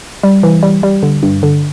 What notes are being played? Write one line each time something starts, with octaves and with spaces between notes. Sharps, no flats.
G3
E3
G3
G3
D3
G2
D3